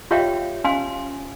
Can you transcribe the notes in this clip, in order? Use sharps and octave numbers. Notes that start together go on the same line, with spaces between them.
F4 G4 C#5 E5 F5 G5
C#4 F5 G#5 C6